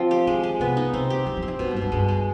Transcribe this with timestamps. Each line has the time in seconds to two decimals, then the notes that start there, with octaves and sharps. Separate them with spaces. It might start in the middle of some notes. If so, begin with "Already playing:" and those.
Already playing: F3 C4
0.11 G4
0.27 D#3 G#3
0.43 G#3
0.60 C3 B3
0.77 D#4
0.93 C3 C4
1.10 G4
1.26 F3 C4
1.37 F3
1.43 C4
1.48 D#3
1.59 B2 D3
1.71 G2
1.76 B2
1.82 G2
1.92 G2 G#3
2.08 G#3